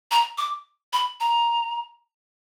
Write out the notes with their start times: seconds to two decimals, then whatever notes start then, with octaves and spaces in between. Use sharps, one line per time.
0.11 A#5
0.38 D6
0.93 B5
1.20 A#5